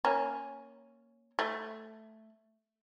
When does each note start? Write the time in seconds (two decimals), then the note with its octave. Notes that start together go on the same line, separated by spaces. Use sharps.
0.05 A#3 C#4
1.39 A3